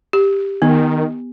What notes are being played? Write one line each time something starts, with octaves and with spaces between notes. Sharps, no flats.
G4
D#3 B3